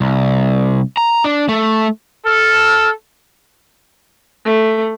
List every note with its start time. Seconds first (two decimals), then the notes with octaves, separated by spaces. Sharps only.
0.01 C2
0.97 A#5
1.24 D4
1.49 A3
2.26 A4 F6
4.45 A3